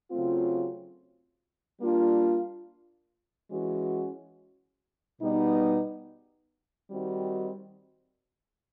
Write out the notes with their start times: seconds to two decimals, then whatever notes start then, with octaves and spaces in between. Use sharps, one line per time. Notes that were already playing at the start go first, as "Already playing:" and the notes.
0.10 C#3 F#3 A3 C4 F4
1.80 G3 A#3 D4 F4
3.50 E3 G#3 C#4 F#4
5.21 B2 G3 B3 D#4
6.90 D#3 G3 C4 D#4 F#4